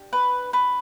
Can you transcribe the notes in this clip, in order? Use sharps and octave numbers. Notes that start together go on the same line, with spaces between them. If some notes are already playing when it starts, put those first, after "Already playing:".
Already playing: D4 G4
B4
B4